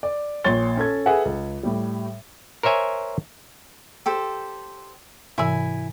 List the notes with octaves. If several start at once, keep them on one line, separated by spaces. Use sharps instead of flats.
D5
A#1 A#2 C#5 C6 A6 G7
C#4 A4 G#6
G#4 A4 B4 E5 F#5 G#5
C#2
A2 G3
A#4 C5 C#5 E5 G#5
G4 A4 C5
G#2 C3 E3 E4 G#5